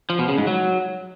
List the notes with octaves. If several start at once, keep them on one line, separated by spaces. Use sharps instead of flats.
F3
B2
C#3
G#2
F#3